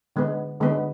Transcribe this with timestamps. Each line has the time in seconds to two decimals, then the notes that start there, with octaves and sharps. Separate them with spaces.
0.16 D3 G#3 B3
0.61 D3 G#3 B3